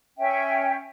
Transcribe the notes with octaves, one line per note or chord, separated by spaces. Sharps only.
C#4 E5 G5